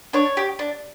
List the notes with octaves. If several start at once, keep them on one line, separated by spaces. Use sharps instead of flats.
D4 C#5
G4
D4